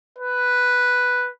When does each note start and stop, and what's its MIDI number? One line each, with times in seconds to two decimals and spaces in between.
0.19 1.29 71